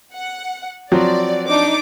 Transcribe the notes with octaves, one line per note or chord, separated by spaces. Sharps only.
F#5
F3 F#3 C4 D5
D4 D#4 D6